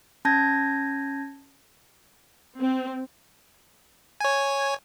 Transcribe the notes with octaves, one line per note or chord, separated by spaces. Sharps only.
C#4 A5 G6 G#6 A#6
C4
C#5 G#5